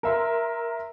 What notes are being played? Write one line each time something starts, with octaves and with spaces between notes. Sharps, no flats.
A#4 E5 C6